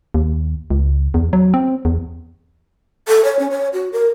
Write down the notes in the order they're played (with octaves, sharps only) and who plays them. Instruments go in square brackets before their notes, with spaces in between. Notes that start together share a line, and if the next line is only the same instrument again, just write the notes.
[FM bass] D#2
C#2
E2
F#3
C4
E2
[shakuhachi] A4
C#5
C#4
C#5
F#4
A#4